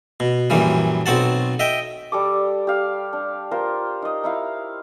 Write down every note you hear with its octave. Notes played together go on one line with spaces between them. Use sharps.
B2
A#1 F#2 E3 G3
B1 C4 F#4 F#5 A5
D#5 E5 G5
G3 A4 D6
G4 F5
D4
F4 A#4 C5
D#4 D#5
D#4 E4 F5